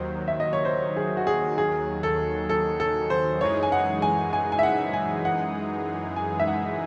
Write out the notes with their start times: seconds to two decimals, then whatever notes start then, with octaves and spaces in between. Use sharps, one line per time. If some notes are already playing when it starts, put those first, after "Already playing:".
Already playing: D#2 D#3 F#3 C5
0.28 E5
0.40 D#5
0.53 C#5
0.65 C5
0.97 G#4
1.17 F#4
1.27 G#4
1.58 G#4
2.03 A4
2.49 A4
2.80 A4
3.10 C5
3.41 F#2 E3 G#3 D#4 G#4 C#5
3.63 G#5
3.72 F#5
4.02 G#5
4.33 G#5
4.52 G#5
4.59 E5
4.63 F#5
4.93 G#5
5.25 F#5
6.16 G#5
6.40 E5
6.47 F#5